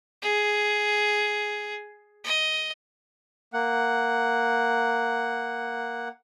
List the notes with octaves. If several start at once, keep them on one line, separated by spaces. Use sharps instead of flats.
G#4
D#5
A#3 F#5